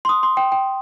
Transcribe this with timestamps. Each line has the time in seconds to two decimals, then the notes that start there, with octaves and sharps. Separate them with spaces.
0.05 C6
0.09 D#6
0.23 C6
0.37 G5
0.52 G5